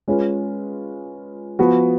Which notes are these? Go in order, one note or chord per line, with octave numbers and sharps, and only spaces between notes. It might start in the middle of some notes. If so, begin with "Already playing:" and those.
G#3 C#4 F4 B4
F3 B3 F#4